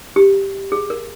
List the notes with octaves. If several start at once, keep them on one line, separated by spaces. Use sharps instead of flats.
G4
G#4
A#4